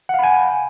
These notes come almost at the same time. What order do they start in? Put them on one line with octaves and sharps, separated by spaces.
F#5 F5 B5 G#5